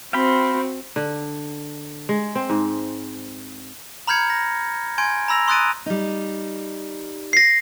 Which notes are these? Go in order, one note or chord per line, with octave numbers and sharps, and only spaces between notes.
C4 F#4 F5 G5 B5
D3
G#3
C4
G#2
A#5 B5 F6 G6 G#6 C#7
A#6
G#5 C6 G6 G#6 D7
A#5 B5 E6 A#6 F7
C6 D#6 F#6 A6 D7 D#7
G3 D#4
A#6 C7